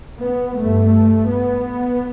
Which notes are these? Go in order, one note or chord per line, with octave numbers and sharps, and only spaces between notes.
B3
G2 A3
B3